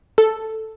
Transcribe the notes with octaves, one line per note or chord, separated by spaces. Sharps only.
A4